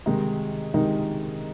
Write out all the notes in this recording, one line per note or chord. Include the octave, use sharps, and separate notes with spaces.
C3 D#3 G#3 D#4
C3 D#3 G#3 D#4